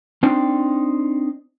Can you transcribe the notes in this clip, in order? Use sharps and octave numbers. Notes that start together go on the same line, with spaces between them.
C4 D4 D#4 C5 D5 G5